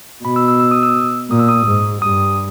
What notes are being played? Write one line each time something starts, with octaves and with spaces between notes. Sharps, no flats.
B2 B5
E6
E6
E6
D#6
E6
A#2 D#6
E6
D#6
G#2
G2 D#6